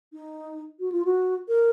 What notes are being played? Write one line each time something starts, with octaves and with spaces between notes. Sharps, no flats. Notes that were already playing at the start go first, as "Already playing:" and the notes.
D#4
F#4
F4
F#4
A#4